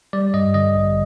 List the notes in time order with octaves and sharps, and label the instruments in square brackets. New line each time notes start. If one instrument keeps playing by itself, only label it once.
[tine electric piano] G3 D5
G2 D#5
D3 D#5
A1